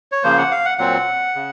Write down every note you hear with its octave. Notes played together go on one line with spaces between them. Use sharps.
C#5
C#3 F3 A#3 C5
F#5
F5
F#5
A#2 F#3 C4 F#5
C#3